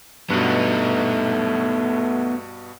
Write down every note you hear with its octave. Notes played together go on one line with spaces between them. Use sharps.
G2 B2 A3 B3 D#4